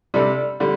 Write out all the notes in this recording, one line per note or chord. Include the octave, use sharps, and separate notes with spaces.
C3 G3 D4 A4
D3 G3